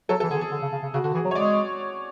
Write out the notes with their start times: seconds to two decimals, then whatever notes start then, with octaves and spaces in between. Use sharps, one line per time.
0.09 F#3 A4
0.20 E3 A4
0.31 D3 G#4
0.38 E3
0.41 G#4
0.51 D3
0.62 C#3
0.72 C#3
0.83 C#3
0.94 C#3 F#4
1.04 D3 F#4
1.14 E3 G#4
1.25 F#3
1.31 C#5
1.35 G#3 D5